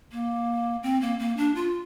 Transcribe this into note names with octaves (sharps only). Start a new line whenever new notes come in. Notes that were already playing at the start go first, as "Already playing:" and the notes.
A#3
C4
A#3
A#3
D4
F4